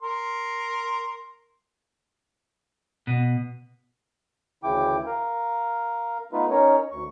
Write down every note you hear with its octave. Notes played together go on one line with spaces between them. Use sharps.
A#4 C6
B2
D2 C#3 E3 E4 G5 D6
A#4 F5
A3 B3 D#4 F4 B4
C#4 D#4 A#4 C#5
D2 C#6